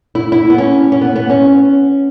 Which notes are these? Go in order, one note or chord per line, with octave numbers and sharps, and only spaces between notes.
E4
E4
B3
C#4
C#4
B3
B3
C#4